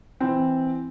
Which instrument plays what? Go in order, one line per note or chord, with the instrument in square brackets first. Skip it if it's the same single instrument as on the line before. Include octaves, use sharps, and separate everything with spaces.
[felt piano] E3 C4